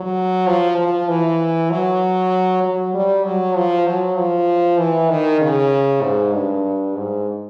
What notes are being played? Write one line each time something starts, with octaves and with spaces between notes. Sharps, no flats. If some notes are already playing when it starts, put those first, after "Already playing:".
Already playing: F#3
F3
F3
E3
F#3
F#3
G3
F#3
F3
F#3
F3
E3
D#3
C#3
G#2
G2
G#2